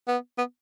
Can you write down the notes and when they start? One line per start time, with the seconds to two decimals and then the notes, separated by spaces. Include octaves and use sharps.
0.07 B3
0.38 B3